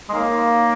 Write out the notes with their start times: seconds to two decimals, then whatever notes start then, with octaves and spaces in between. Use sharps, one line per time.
0.09 G#3
0.12 A#3 D#4 A#4 C#5 F5